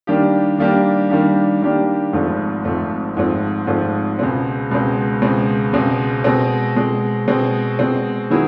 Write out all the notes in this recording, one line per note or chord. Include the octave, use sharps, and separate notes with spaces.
D#3 G3 A#3 D4 G4
D#3 G3 A#3 D4 G4
D#3 G3 A#3 D4 G4
D#3 G3 A#3 D4 G4
G#1 G#2 F3 A3 C4
G#1 G#2 F3 A3 C4
G#1 G#2 F3 A3 C4
G#1 G#2 F3 A3 C4
C#2 B2 G#3 C4
C#2 B2 G#3 C4
C#2 B2 G#3 C4
C#2 B2 G#3 C4
B2 G#3 C4
B2 G#3 C4
B2 G#3 C4
B2 G#3 C4
D#3 F#3 B3 E4 G#4